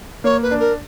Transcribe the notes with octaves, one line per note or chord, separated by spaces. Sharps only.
A#3 C#5
B4
D4
A#4